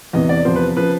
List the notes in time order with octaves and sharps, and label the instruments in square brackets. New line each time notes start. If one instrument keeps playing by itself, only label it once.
[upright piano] E2 C3 E3 D#5
D5
E2 C3 F3 C5
B4
C#3 F3 B4